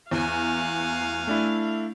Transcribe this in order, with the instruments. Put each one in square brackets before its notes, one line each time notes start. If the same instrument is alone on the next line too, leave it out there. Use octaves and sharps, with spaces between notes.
[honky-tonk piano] E2 [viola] F5 [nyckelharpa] F#5 G#5
[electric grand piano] A3 D4 E4